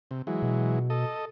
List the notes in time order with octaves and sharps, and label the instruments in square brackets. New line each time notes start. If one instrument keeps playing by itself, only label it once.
[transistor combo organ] C3
E3 F#3 G#3
[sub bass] B2
[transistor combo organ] A4 D#5